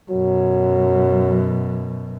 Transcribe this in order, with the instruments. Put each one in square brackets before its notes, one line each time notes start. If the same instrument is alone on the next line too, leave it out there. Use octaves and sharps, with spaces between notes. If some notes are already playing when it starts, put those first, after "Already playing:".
[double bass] F#2 B2 [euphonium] F#3